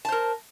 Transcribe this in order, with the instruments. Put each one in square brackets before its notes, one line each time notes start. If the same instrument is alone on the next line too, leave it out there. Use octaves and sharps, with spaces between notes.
[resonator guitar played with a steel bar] A5
C5
A#4